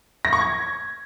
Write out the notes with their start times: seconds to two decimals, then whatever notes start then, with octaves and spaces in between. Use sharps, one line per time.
0.25 A#6
0.33 C#6
0.41 G#6